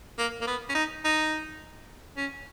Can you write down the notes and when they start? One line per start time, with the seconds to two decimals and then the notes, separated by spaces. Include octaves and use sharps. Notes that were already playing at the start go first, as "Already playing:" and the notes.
0.18 A#3
0.41 A#3
0.47 B3
0.69 C#4
0.75 D#4
1.04 D#4
2.17 C#4